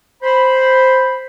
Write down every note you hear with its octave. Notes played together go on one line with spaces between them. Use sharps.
C5 B5